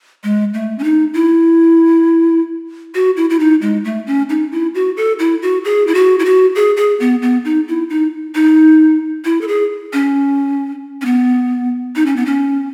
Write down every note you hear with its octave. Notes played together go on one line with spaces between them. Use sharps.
G#3
A3
C#4
D#4
E4
F#4
E4
E4
D#4
G#3
A3
C#4
D#4
E4
F#4
A4
E4
F#4
G#4
E4
F#4
E4
F#4
G#4
G#4
B3
B3
D#4
E4
D#4
D#4
E4
A4
G#4
C#4
C#4
B3
D#4
C#4
B3
C#4